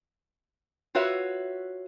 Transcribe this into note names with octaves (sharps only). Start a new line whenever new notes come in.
F4 F#4 B4 C#5 E5